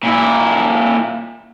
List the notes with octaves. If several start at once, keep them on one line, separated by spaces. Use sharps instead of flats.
A#2 E4